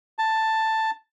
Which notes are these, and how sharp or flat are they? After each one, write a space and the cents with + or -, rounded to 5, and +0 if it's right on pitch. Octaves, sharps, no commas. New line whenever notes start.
A5 +5